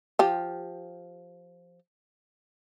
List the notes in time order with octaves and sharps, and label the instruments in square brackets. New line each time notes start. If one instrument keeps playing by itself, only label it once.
[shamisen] F3 G4